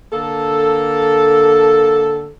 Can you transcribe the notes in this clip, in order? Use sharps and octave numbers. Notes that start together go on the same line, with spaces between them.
D3 A#3 A4